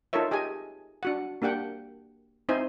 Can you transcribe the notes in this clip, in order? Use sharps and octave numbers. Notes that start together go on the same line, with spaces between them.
D#4 F4 A4 A#4 C#5 E5
G4 G#4 D#5 G#5
D4 F#4 F#5
A#3 D4 G4 F#5 G5
C4 D#4 E4 C5 G#5